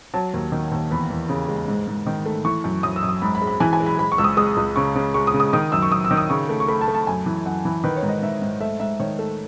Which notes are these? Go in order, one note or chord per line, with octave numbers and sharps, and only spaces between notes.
F#3 A5
D#2
D#3
D#2
E2 B5
E2
C#3
G#3
G#2
G#2
D#3
A3
E3 C#6
F#2
F#2 D#6
E6
F#2
D#6
G#2 B5
B5
G#3
B5
E3 G#5
G#5
G#3
B5
G#3 B5
C#6
C#2 E6
D#6
G#3 D#6
C#2
C#3 C#6
C#3
G#3 C#6
D#6
C#3
D#6
D#3 D#6
F#2 E6
C#6
F#2 D#6
E6
D#3
D#6
C#3 C#6
A3
C#6
A3 B5
A5
A3
A5
F#2 G#5
E3
F#2 F#5
E3
D#3 B4
C#5
G#2
D#5
G#2 E5
G#2
A3 E5
G#2 E5
D#3 C#5
A3